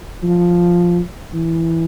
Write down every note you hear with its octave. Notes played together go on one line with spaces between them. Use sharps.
F3
E3